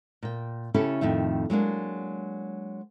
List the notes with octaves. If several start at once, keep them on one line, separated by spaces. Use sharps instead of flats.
A#2 G5
C#3 C#4 E4 G4 A4 A5
F2 A2 D#3 E5
F#3 G#3 A#3 D4